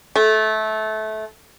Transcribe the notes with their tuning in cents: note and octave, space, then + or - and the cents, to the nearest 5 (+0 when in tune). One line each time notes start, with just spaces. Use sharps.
A3 -20